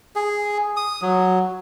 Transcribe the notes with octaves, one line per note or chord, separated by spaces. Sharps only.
G#4
D#6
F#3